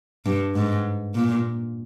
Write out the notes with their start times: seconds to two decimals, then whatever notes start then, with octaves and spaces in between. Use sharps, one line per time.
0.26 G2
0.55 G#2
1.15 A#2